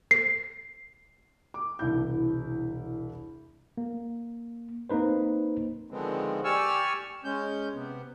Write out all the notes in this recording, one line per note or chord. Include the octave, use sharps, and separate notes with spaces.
C7
D6
E1 C2 E4 G6
A#3
A#3 C4 D#4 B4 C5
D3 D#3 F3 G#3 B3 C4
G4 D5 G#5 C#6 E6 F6
G#3 C#4 G6
C3 B3